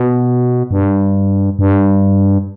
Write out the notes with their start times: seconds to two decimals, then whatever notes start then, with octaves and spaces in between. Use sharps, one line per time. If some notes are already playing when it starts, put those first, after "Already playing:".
Already playing: B2
0.71 G2
1.59 G2